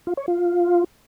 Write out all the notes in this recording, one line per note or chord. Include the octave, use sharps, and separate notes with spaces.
F4
C#5
F4